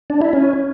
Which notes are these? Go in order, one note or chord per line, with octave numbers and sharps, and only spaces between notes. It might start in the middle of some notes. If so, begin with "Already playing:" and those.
D4
E4
C#4